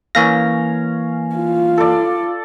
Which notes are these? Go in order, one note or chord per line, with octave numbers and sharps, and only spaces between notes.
E3 A#3 C#4 F5 A#6
F4
A4 D5